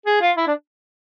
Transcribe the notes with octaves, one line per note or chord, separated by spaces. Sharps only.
G#4
F4
E4
D4